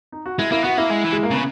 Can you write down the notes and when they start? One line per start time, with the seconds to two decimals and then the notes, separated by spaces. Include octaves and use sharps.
0.12 D#4
0.26 F#4
0.39 G#3 E4
0.52 A#3 E4
0.64 B3 F#4
0.78 A#3 E4
0.91 G#3
1.04 E3
1.13 G#3
1.23 A#3
1.30 C#3 B3